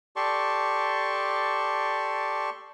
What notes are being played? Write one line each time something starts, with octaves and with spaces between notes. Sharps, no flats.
G4 A4 D5 A5 C6 C#6